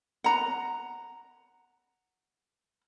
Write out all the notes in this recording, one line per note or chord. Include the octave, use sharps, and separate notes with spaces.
F#5 A#5